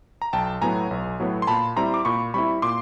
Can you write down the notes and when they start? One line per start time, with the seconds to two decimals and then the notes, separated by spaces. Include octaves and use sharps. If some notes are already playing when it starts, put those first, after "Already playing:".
0.22 A#5
0.33 B1 G5 A5
0.61 A2 F#3 B3 G#5 A#5
0.91 B1
1.20 A2 F#3 B3
1.42 C6
1.47 A#2 A5 B5
1.76 G3 C4 E4 A#5 C6
1.94 D6
2.05 A#2 B5 C#6
2.34 G3 C4 E4 B5 C#6
2.62 A#2 C6 D6